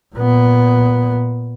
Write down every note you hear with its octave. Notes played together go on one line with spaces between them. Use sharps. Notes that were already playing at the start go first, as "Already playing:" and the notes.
A#2 B3